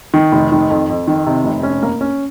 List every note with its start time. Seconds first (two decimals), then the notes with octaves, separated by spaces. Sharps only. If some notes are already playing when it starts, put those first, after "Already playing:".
0.14 D#3
0.32 F1
0.52 D#3
0.70 F2
0.89 F2
1.08 D#3
1.26 C3
1.44 F1
1.63 C#4
1.83 A#3
2.01 C#4